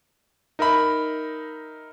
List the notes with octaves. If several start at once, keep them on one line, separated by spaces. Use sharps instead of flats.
D#4 A#4 E5 B5